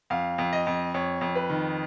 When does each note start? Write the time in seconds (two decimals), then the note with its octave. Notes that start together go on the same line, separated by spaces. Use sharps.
0.10 F2 F5
0.38 F2
0.53 D#5
0.67 F2
0.94 F2 C#5
1.21 F2
1.35 B4
1.50 D#3